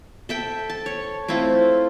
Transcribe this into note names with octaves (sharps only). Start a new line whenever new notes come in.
A4 E5 G5
A5
C#5
A3 C4 E4 F4